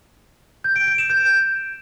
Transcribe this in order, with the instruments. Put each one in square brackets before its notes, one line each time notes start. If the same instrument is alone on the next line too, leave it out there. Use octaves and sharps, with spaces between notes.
[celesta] G6
D7
D7
E7
G6